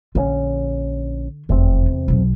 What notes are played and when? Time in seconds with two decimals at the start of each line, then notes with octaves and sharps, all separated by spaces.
0.15 A#1 D3 D#3 C#4
1.49 F1 E2 C3 D#3 C4
2.08 B1 F#3